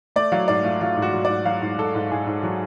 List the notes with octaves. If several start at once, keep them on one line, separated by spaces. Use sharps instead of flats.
A3 D5
F#3 F5
G#2 D5
A3 F4
F#3 F4
G#2
F#4
F#3
G#2 D5
F#3 F5
G#2
G#2 A4
G#2
G#2 G#4
G#2
F#3